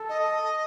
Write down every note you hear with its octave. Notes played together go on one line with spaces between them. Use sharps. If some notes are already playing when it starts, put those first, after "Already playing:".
Already playing: A4
D#5